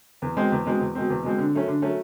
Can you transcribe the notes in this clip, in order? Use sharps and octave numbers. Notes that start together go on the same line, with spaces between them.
E2
B2 G#3 C4
E2
B2 G#3 C4
E2
B2 G#3 C4
E2
B2 G#3 C4
D3
F#3 A3 C#4
D3
F#3 A3 C#4